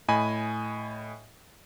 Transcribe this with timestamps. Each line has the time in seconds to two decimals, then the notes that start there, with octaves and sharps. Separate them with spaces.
0.08 A2 D#5 G#5 B5